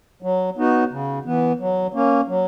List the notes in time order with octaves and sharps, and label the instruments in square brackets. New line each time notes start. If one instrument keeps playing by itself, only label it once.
[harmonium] F#3
B3 D#4 F#4
C#3
E3 B3
F#3
A#3 C#4
F#3